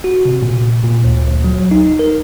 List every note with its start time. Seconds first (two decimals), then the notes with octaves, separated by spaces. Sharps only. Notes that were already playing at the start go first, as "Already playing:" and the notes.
0.04 F#4
0.26 C3
0.42 A#2
0.84 A#2
1.04 D2
1.27 D2
1.44 F#3
1.71 D#4
1.99 A#4